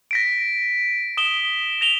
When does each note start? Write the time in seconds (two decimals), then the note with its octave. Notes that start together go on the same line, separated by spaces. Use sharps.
0.11 A#6 B6 D7
1.17 D#6 E7 G7
1.81 A#6 F7 G7